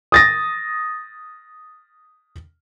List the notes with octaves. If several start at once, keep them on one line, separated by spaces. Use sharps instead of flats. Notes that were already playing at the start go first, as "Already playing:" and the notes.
D#6 A6 A#6